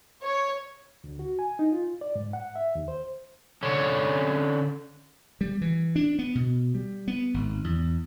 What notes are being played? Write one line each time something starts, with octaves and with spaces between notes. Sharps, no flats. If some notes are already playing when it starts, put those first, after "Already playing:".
C#5
D2
F#4
G#5
D#4
F4
D5
G#2
F#5
E5
D#2
C5
D3 C#4
G3
E3
D4
B3
B2
G3
B3
G#1
E2